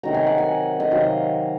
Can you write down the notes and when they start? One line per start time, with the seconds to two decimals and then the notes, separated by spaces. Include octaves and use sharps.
0.03 C3 D#3 F#3 A#5
0.14 G#5
0.27 F#5
0.38 G#5
0.80 D#5
0.91 C3 D#3 F#3 F5